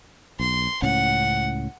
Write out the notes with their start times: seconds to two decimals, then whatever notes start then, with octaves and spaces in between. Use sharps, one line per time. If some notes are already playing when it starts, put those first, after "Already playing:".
0.40 B1 C6
0.82 C#2 A2 C#4 F#5